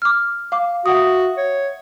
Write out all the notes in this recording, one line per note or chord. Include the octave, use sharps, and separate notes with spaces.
D6 F6
F5 D6
F#4 E5 F#5 D#6
C#5